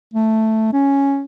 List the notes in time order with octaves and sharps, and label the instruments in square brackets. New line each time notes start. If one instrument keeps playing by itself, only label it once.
[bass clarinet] A3
C#4